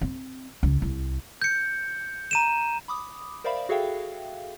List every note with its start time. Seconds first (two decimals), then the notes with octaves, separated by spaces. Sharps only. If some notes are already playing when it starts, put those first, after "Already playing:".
0.01 C4
0.63 C#2
0.82 C2
1.42 G6 C#7
2.31 A#5 D#7 E7
2.88 B5 D6 D#6
3.44 A#4 C5 D5 E5 F5 B5
3.69 F#4 G#4 A4 E5 F5 G5